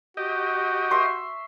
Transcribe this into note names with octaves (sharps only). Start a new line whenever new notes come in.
F#4 G4 D#5
E5 C6 C#6